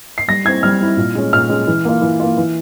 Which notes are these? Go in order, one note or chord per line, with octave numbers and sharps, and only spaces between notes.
C7
G3 A#6
C4 E4 G#6
G3 F6
C4 E4
A#2
G#3 C#4
A#2 F6
G#3 C#4
E3
A#3 F4
E3
A#3 F4
E3